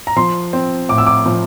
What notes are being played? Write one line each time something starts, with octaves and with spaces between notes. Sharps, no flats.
A#5
F3 C6
C4
A2 D6
E6
D6
F3